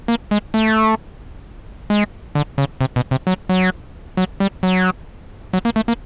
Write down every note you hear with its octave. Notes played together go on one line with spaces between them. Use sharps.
A#3
G#3
A3
G#3
D3
C#3
C3
B2
C3
F#3
F#3
F#3
G3
F#3
F#3
A#3
A3
A#3